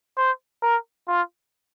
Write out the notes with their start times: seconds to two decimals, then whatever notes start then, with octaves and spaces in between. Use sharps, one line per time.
0.18 C5
0.62 A#4
1.08 F4